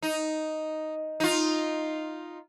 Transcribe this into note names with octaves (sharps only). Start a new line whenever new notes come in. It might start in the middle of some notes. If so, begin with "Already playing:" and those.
D#4
D#4 F4